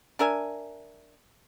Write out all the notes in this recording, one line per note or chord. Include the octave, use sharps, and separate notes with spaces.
D4 A#4 E5 G#5